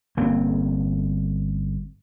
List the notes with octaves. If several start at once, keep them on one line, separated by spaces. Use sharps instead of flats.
G1 A#3 C4 C#4